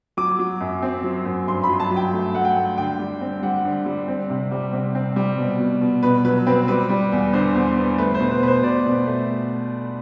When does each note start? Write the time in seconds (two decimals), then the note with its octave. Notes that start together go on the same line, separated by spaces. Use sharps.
0.17 F#3 D6
0.39 F#3
0.61 F#2
0.82 C4
1.04 F#3
1.25 F#2
1.48 G2 C6
1.64 B5
1.69 F#3
1.80 A5
1.91 F#3
1.97 G5
2.13 A3
2.34 A3 F#5
2.45 G5
2.56 A3
2.78 D3 G5
2.99 G3
3.21 C4
3.43 G3 F#5
3.65 D3
3.86 G3
4.08 C4
4.30 C3
4.51 G3
4.73 C3
4.95 C4
5.16 G3
5.38 B2
5.60 B2
5.81 B2
6.03 B2 B4
6.24 F#3 B4
6.47 C4 B4
6.68 G3 B4
6.90 G3
7.12 E2
7.33 D3 C5
7.55 E2
7.77 B3
7.98 A3 B4
8.14 C5
8.20 B2
8.31 B4
8.42 B2 B4
8.48 C5
8.63 B2 D5
8.85 B2
9.07 A3